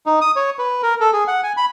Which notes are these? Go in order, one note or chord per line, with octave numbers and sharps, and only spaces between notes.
D#4
D#6
C#5
B4
A#4
A4
G#4
F#5
G#5
B5